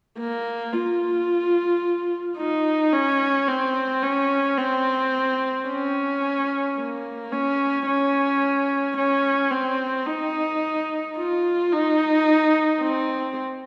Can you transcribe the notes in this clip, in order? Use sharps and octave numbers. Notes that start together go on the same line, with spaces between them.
A#3
F4
D#4
C#4
C4
C#4
C4
C#4
A#3
C#4
C#4
C#4
C4
D#4
F4
D#4
C4